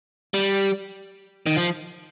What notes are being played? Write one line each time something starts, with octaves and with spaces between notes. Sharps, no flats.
G3
D#3
F3